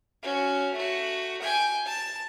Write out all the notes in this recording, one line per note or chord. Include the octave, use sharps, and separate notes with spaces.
C#4 F#4
A3 F#4
G5 G#5
A5